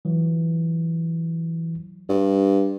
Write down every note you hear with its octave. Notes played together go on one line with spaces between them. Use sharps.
E3 F#3
G2